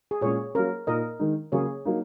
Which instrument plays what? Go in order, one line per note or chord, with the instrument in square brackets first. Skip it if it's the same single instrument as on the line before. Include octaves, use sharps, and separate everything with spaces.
[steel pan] G#4
[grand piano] A#2 G#3 C#4 [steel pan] G#4 C#5
[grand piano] F#3 A#3 C#4 [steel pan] A#4
[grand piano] A#2 A#3 D#4 [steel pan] A#4 D#5
[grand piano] D#3 G#3 D#4
[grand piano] C#3 F#3 A#3 C#4 [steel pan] G#4 C#5
[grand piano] F#3 A#3 D#4